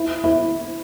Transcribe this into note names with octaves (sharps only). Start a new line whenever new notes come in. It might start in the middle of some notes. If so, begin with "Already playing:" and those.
Already playing: E4
E4